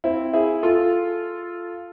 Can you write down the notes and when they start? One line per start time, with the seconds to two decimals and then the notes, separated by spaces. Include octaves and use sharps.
0.04 C4 E4
0.33 E4 G#4
0.63 F4 A4